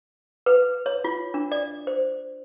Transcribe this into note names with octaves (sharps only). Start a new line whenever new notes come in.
B4
C#5
F4
D4
D5
C5